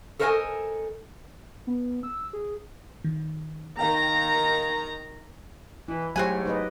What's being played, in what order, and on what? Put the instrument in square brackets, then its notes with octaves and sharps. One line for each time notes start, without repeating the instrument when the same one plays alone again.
[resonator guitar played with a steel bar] A4 A#4 C5 D#5 F5 G#5
[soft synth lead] B3
E6
G#4
[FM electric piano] D#3
[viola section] D#3 A#5 [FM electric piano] A#4 F5 G5
[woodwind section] B2 E3 [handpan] E4
[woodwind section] G#2 A3 [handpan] F#3 G4 C#5 [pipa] C4 F#4 G#5
[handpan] D#4 B4 D#5